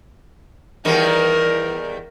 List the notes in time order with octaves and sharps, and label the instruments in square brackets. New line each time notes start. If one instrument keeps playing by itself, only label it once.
[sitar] E2 D#3 G3 [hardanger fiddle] A#4